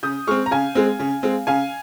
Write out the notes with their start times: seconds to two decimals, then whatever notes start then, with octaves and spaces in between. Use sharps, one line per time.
0.03 C#3 D#6 G6
0.27 G#3 C4 C#6 F6
0.46 A#5
0.51 C#3 F5 G#5
0.75 G#3 C4
1.00 C#3
1.23 G#3 C4
1.47 C#3 F5 G#5